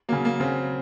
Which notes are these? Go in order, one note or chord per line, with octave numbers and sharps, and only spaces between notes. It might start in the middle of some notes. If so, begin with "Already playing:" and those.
C#3 F#3 A#3
A#3
C#3 F#3 C4